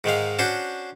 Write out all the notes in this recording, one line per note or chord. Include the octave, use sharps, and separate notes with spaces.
G#2 D#3 G#3 F5
C#4 D4 F#4 C5